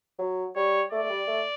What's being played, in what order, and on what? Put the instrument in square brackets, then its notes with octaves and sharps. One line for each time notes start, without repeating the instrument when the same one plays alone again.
[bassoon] F#3
[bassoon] G3 [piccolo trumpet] C#5
[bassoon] A3 [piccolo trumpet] D5
[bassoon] A3
G3
A3